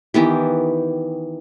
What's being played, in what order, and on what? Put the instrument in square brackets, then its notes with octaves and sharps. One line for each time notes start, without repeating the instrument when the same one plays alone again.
[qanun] D#3 E3 B3 G4